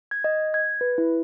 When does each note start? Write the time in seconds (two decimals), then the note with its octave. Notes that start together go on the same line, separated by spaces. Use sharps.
0.11 G#6
0.24 D#5
0.54 G#6
0.81 B4
0.98 E4